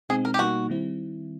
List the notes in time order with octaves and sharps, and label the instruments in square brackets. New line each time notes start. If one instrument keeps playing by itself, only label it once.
[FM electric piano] B2 G#3 C4 D#4 [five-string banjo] G#4
[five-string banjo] A#4
G4
[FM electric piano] B2 G3 A#3 D#4 [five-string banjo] F#4
[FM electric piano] D#3 G3 C4 E4